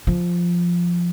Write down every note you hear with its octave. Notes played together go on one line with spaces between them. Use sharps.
F3